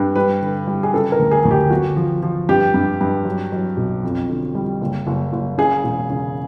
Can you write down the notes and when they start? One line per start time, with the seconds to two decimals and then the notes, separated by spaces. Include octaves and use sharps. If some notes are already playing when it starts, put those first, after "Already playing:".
Already playing: G2
0.16 G3 B4
0.41 D3
0.67 G3
0.83 G#4
0.93 C#3 A4
1.12 A#4
1.19 D2
1.31 G#4
1.45 D2
1.51 G4
1.70 G1 F#4
1.96 F3
2.23 F3
2.49 G2 G4
2.74 G2
3.01 G2
3.25 F#3
3.52 F#3
3.77 B1
4.03 F2
4.29 D3
4.55 G3
4.81 F#1
5.07 F#1
5.33 F#1
5.58 C#3 G#4
5.84 E1
6.10 C#3